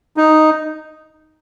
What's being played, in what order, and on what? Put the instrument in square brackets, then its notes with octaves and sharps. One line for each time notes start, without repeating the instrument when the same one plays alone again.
[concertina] D#4